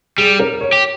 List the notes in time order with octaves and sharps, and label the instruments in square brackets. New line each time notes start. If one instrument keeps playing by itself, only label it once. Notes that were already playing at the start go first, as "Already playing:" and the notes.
[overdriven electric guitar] G3 [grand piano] G#4
[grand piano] A#4
C#5
[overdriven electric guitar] G4